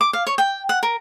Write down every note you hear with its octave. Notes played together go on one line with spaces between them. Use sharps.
D6
F5
C#5
G5
F#5
A#4